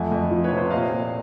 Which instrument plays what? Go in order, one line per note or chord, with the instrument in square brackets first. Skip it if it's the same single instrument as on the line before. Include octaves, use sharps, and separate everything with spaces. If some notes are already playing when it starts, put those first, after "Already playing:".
Already playing: [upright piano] F2 A3 [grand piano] F#5 G#5
[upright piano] F2
F3
[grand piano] B4 C#5
[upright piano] C3
[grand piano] C5
[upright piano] A#2 [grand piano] D#5 F5
[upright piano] A#2